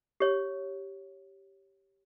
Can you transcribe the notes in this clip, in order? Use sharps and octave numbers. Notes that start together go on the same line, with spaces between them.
G4 C#5